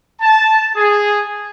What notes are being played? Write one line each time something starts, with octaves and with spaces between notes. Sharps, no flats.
A5
G#4